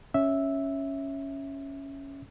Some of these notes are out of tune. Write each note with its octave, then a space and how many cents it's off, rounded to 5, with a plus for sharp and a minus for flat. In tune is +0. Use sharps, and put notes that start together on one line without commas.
C#4 +0 E5 -5